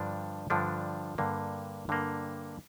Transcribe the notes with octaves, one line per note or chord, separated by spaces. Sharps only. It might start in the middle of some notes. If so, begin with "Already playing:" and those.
Already playing: G2 D3 F3 D4
G2 D3 F3 D4
G2 D3 A#3
G2 D3 A#3